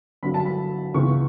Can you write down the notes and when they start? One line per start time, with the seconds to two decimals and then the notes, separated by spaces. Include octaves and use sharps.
0.23 G1 G2 F#3 B5
0.34 A5
0.45 B5
0.94 C#2 C#3 E3 B3 C#6